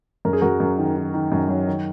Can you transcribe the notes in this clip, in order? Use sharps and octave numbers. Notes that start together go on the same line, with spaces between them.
F#2 A#4
G#4
F#2 F#4 A#4
F#2
D#3
D#3
D#3
F#2
F#3
D#3